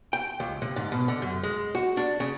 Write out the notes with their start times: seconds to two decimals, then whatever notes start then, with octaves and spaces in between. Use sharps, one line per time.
0.13 G5
0.40 C#2
0.62 C3
0.76 G#2
0.92 B2
1.08 D3
1.22 F#2
1.43 G#3
1.75 F#4
1.97 D4
2.20 C#3